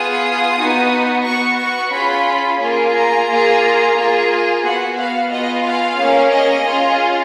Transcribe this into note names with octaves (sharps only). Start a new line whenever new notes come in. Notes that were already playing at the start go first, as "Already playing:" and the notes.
Already playing: B3 F4 G#4 D#6
B3 D#4 F#4
B3 F#4 C#6
C#6
C#4 F4 G#4 B5
A#3 F4 G#4
A#5
A#3 F4 G#4
A#3 F4 G#4
B3 F#4 F#5
F5
B3 F4 G#4 D#5
F5
A#3 C#4 G#4
D#5
C#4 F4 G#4